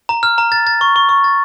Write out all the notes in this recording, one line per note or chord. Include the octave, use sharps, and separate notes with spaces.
A#5
F6
A#5
A6
A6
C#6
C#6
C#6
A6